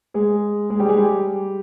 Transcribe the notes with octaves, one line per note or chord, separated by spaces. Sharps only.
G#3 G#4
G#3 G#4
G3 G4
G#3 G#4
G3 G4